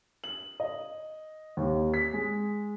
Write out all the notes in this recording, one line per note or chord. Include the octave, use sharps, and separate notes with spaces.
F#7
D#5
D#2
B6
G#3